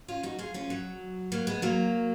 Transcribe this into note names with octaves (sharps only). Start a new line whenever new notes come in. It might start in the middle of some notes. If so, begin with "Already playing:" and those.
C#4 F4
D#4 F#4
F4 G#4
C#4 F4
F#3
F#3 A#3
G#3 B3
F#3 A#3